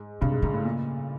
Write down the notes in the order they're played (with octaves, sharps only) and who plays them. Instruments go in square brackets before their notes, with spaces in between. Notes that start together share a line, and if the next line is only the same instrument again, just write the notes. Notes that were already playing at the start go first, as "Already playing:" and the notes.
Already playing: [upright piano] G#2
[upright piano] G2 [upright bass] C3
[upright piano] G#2
[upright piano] G#2 [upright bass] C#3
[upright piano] A2
A#2